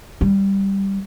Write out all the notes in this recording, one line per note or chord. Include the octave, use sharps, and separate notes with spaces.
G3